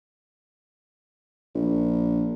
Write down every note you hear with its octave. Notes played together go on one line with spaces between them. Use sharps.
A#1